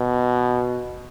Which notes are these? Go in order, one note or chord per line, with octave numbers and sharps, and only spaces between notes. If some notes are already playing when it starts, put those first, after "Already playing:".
Already playing: B2